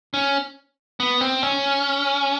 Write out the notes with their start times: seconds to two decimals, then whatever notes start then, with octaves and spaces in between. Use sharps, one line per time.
0.14 C#4
1.00 B3
1.21 C4
1.43 C#4